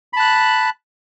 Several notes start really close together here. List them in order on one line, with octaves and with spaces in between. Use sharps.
B5 A5 F#6